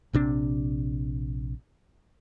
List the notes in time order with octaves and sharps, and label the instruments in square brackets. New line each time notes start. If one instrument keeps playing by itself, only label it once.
[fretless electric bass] A#1 C3 D4